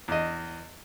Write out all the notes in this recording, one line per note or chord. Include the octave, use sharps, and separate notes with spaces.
E2 D#5